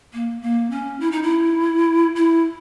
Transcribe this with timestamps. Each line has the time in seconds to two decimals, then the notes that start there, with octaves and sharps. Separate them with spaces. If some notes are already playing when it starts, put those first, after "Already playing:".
0.13 A#3
0.42 A#3
0.71 C#4
1.00 E4
1.12 D#4
1.22 E4
2.16 E4